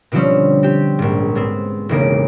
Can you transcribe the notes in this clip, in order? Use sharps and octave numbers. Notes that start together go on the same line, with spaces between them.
B2 D3 F3 G3 C4 C#4
C4 G4
A#1 G#2
G#2 B3 C4
E1 B1 C#3 A#3 D7